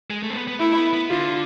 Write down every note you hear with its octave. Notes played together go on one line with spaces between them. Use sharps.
G#3
A3
C4
B3
B3
A3 E4
B3
B3
D3 F4